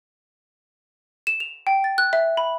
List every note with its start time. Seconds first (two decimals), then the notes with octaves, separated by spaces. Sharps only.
1.27 E7
1.40 F7
1.67 G5
1.84 A6
1.98 F#6
2.13 E5
2.37 B5